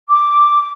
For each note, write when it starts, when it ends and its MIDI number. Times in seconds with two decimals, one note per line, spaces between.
0.09 0.69 86